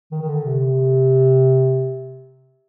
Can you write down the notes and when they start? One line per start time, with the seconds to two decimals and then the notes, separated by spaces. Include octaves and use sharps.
0.11 D#3
0.22 D#3
0.28 D3
0.45 C3